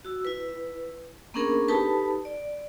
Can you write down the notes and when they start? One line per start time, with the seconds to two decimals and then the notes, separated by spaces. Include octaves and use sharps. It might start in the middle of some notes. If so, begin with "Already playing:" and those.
0.05 F#4 E6
0.25 E4 B4
1.34 A#3 B3 C#4 D4 G#4 A#4
1.68 D#4 G4 A4 B4 A5 B5
2.25 D5